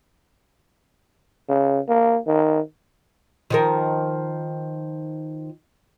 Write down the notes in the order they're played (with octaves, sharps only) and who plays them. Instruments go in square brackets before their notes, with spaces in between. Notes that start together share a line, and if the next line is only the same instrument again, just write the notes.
[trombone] C#3
A#3
D#3
[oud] D#3 F3 A#4